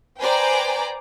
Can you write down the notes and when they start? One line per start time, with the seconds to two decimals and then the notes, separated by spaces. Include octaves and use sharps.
0.21 B4 C5 D5 G5 G#5 A#5